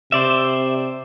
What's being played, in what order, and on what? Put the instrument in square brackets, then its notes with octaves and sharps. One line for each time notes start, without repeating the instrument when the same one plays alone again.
[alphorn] C3 [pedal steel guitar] C5 D5 E5